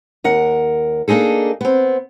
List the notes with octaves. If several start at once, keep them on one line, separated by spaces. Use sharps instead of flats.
D#2 A#4 F#5
A#3 D4 D#4 G#4 A4
B3 C4